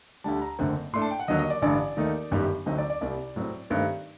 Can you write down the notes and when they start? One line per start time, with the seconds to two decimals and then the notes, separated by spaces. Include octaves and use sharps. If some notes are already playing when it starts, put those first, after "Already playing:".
0.24 D2 D3 G3 A5
0.42 A#5
0.59 F#1 F#2 D3 A3 C4
0.93 A2 A3 D4 C6
1.02 A5
1.11 G5
1.19 F#5
1.28 D#2 D3 F#3 D#5
1.39 D#5
1.50 D5
1.62 A1 G2 D3 D5
1.97 D#2 D#3 A3 D#4
2.31 G1 F#2 D#3 G3
2.66 D2 D3 F#3 C4 D#4 D#5
2.78 D5
2.90 D5
3.01 C2 C3 G3 D5
3.36 A2 F#3 C4
3.70 G2 D#3 A3 C4 D#4